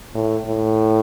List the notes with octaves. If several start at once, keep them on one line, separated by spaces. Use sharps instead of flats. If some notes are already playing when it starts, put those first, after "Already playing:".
A2
A2